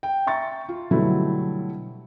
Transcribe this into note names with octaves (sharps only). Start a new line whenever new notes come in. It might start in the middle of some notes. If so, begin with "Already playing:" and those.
G5
E5 A#5 C#6 A6
F4
B2 D3 F#3 G3 A3 E4